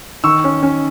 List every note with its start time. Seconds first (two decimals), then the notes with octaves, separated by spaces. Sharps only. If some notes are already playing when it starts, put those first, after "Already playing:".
0.24 D#3 C#6 E6
0.44 C#4
0.63 C#4